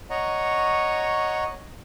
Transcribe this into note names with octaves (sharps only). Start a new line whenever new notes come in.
C#5 D#5 F#5 A#5 C#6